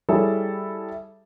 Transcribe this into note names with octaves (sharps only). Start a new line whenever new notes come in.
G3 E4 G#4 A4 C#5